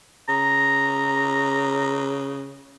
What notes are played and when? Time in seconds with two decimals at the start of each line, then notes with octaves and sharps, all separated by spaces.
0.29 C#3 A#5